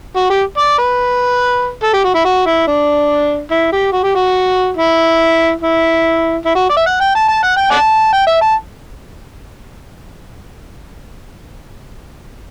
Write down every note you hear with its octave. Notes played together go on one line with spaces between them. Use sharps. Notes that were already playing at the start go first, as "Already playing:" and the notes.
F#4
G4
D5
B4
A4
G4
F#4
E4
F#4
E4
D4
E4
G4
F#4
G4
F#4
E4
E4
E4
F#4
D5
E5
F#5
G5
A5
A5
F#5
G5
D5 F#5 A5
G5
E5
A5